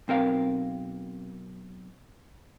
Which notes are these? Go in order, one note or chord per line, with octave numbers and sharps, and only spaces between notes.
B1 C4 A#4 F5